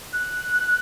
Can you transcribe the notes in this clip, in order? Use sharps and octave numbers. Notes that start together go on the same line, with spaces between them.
F#6